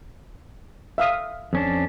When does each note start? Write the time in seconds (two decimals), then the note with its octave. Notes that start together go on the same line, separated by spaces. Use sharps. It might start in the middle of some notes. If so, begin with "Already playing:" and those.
0.98 E5 F5 D#6
1.53 F2 C#4 D4